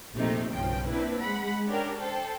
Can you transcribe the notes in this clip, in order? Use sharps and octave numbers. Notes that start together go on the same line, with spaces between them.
A#1 F2 C3 A3 D#4
B1 G2 C#3 F3 G5
A#3 C4 D4 E4 B4
G#3 F#5 B5
C#4 D4 G4 A#4
A4 C5 G5